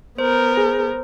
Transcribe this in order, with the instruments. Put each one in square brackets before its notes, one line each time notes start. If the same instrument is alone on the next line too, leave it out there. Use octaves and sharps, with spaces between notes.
[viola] B3 A#4 [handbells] C5
[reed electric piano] G#4